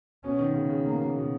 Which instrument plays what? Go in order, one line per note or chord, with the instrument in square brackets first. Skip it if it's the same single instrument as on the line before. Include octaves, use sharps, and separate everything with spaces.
[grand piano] B2 [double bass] C#4
[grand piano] D#3
C#3
C#3
[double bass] A#3
[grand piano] C#3
B2
B2